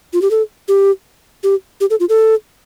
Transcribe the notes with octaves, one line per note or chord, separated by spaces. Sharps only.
F4
G4
A4
G4
G4
G4
A4
F4
A4